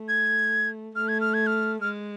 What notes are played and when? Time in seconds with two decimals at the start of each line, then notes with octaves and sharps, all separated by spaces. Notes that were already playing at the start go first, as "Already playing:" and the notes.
Already playing: A3
0.08 G#6
0.96 A3 F6
1.08 G#6
1.21 F6
1.34 G#6
1.47 F6
1.82 G#3 F6